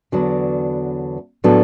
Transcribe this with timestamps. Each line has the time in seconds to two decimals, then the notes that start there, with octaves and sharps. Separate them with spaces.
0.12 E2 D3 F#3 B3 D4
1.44 A2 F#3 B3 D4 A4